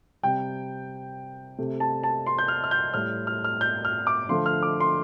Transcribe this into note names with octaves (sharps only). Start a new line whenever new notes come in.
C3 G3 G5
C3 A3
A5
A5
C6
G6
F6
F6
G6
A2 G3 F6
F6
F6
G6
F6
D6
D3 F3 A3 C6
F6
D6
C6